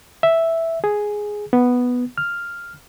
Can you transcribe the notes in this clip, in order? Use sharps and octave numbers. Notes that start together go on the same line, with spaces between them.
E5
G#4
B3
F6